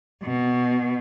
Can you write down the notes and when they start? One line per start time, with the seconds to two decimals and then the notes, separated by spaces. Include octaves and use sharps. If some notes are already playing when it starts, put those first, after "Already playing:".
0.23 B2